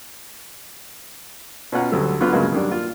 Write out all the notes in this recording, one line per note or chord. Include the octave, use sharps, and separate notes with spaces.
B2 C#4 F4 F#5 A#5
D2 F#3 G3 A4
D3 F#3 B3 F4 F#4
G2 C#3 F#3 G#3 A#3
D#3 F#3 G3 D4
A#3 F4